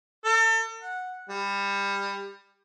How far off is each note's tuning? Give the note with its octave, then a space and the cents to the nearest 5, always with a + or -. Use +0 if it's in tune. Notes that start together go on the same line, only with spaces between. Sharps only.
A4 +40
F#5 -10
G3 +25